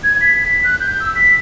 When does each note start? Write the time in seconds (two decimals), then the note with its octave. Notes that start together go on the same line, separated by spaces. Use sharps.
0.04 G#6
0.21 B6
0.45 B6
0.64 F#6
0.80 G6
1.00 E6
1.15 B6